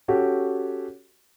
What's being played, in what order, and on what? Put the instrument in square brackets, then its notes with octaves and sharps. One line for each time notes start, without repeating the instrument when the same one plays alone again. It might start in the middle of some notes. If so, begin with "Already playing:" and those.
[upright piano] C#4 F#4 G4 A4